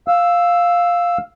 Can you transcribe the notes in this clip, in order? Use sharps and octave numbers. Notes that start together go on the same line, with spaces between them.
F5 E6